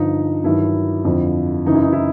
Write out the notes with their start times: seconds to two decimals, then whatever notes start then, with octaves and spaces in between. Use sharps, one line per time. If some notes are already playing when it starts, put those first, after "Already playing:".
Already playing: G2 D3 F3 D#4
0.44 G2 D#3 F#3 E4
1.05 F2 D3 F3
1.66 F#2 C#3 E3 D#4
1.75 E4
1.83 D#4
1.92 E4